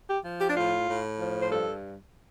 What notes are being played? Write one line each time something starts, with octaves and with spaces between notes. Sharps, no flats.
G4
F3
G4
D4
A2 F4
A2
F3
C5
G2 A4